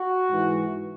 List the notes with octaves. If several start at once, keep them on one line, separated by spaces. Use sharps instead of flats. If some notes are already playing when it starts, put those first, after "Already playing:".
Already playing: F#4
G#2 E3